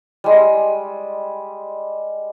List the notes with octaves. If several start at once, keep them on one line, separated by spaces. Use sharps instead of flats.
G3 G#3